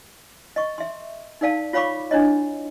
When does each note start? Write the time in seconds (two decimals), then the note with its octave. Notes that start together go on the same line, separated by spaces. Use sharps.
0.56 D#5 C#6
0.78 E5 C6
1.41 D#4 A#4 D5 F5 A5
1.73 F4 C#5 F5 B5 C#6 D6
2.11 D4 E4 C#5 D#5